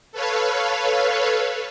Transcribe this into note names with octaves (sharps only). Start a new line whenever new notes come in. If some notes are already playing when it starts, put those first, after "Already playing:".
A4 B4 C#5 F5